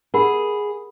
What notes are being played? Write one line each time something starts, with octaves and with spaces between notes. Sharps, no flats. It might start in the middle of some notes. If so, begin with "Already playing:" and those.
G#4 A#4 F#5 B5